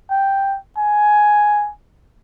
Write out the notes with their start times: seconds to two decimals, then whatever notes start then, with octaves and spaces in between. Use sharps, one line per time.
0.11 G5
0.78 G#5